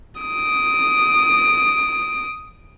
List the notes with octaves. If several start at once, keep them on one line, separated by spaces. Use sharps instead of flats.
D#6 D7